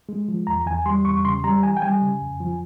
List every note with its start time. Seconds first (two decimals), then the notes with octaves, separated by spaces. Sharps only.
0.09 G#3
0.28 F3
0.47 E2 A#5
0.67 E2 G#5
0.86 G3 C6
1.05 E2 C#6
1.24 C#3 C6
1.44 G3 A#5
1.63 E3 G#5
1.77 G5
1.82 G3 G#5
2.02 C#3
2.21 F2
2.40 F3